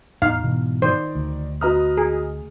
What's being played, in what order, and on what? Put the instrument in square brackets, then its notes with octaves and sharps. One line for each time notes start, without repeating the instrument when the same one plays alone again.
[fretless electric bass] E2 A2 [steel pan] D#4 F5
[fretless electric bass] G#2 B2 E3
[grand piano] D#3 D5 [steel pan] C5
[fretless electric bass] D2
[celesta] F#4 A#5 D#6 [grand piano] B4 D#5 F6
[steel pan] G#4